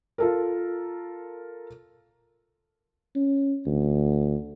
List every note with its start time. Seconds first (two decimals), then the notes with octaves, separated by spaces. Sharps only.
0.18 F4 A4 A#4
3.15 C#4
3.66 D2